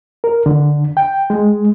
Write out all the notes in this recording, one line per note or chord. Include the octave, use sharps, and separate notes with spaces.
A#4
D3
G5
G#3